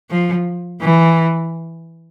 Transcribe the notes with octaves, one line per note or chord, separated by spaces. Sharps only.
F3
E3